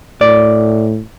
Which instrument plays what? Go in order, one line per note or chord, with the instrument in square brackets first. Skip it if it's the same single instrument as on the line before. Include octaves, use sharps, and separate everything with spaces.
[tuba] A2 [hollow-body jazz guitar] D5